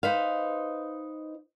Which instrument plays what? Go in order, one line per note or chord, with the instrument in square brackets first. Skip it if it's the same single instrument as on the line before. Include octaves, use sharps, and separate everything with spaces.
[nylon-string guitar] D#4 B4 C5 F5